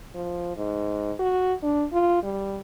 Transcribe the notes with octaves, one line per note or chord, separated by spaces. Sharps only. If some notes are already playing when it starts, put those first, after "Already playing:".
F3
G#2
F#4
D4
F4
G3